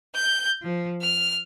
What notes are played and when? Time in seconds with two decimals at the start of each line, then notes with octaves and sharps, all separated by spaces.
0.14 G6
0.61 F3
1.02 F6